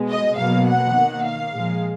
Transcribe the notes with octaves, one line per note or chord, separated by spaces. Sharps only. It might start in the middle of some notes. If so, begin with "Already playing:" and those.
Already playing: B2 G#3
D#5
B2 F#3 A#3 F5
F#5
D#3 A#3
F5
A#2 F3 G#3